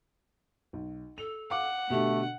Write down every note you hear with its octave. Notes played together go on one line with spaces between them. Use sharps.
B1
A4 F7
F5 F#5 D6
B2 D3 A3 G4